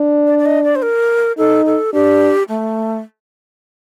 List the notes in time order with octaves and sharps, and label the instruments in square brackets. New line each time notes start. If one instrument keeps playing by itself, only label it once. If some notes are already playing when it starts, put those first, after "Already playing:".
Already playing: [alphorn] D4
[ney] D5
D5
D#5
D5
C5
A#4
[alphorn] D#4 [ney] A4
[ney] A4
[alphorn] D4 [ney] G4
[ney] A3